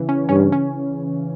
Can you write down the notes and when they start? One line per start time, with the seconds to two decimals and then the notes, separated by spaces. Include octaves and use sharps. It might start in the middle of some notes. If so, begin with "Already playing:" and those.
Already playing: C#3 E3
0.09 C#4
0.29 G2 C#4
0.52 C#4